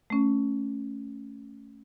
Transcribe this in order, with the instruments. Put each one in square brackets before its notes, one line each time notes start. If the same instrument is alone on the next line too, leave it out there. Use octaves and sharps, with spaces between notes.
[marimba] A3 C#4